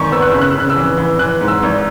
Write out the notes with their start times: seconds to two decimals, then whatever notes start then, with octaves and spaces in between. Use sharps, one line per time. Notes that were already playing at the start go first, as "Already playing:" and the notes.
Already playing: E2 G#2 D#3 C#6
0.12 B3 E6
0.22 F#6
0.31 C#3 E6
0.42 F#6
0.50 E6
0.55 C#3 F#6
0.70 E6
0.76 E3
0.97 E3
1.19 E3 F#6
1.41 G#2
1.48 E6
1.63 G#1